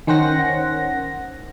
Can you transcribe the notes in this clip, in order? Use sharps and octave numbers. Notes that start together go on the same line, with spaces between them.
D#3 C#4 C5 F#5 A#6